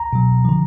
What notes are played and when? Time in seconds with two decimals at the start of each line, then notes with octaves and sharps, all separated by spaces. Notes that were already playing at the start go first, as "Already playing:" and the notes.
Already playing: A#5
0.13 B2 F#3
0.45 D3 F3